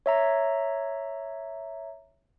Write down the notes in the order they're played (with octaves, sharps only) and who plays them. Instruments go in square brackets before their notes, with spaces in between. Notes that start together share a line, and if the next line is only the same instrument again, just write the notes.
[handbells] C#5 E5 A#5